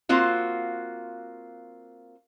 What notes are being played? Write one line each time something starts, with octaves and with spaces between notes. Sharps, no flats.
A#3 C4 F4 F#4